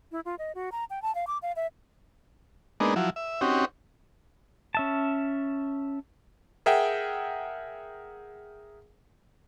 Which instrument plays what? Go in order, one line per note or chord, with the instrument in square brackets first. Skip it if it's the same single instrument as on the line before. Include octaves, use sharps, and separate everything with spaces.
[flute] E4
F4
D#5
F#4
A#5
G5
A5
F5
D6
F5
E5
[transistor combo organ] G#3 A#3 B3 D4 D#4
F3 F#3 E4
E5
C4 C#4 D#4 F#4 G4
[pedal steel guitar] C#4 E5 A5
[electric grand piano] G#4 A#4 E5 F#5 G5